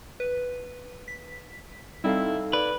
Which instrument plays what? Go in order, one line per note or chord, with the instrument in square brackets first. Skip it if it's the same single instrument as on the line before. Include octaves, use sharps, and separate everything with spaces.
[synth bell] B4
B6
[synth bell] G3 C4 [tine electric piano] D#4 A4 F5 [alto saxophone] E4
[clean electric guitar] B4 [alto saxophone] D5